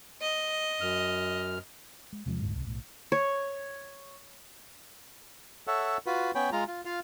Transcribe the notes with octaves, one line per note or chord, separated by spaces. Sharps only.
D#5
F#2 F6
G#3
E2 C3 F3 G#3
F1 D2 G#2 G#3
D1 C2
B1 A2
C#5
A4 C#5 E5 F#5
F4 F#4 B4
B3 C#4 C#5 G5 B5
G#3 F4 A#5
F4
F4 F5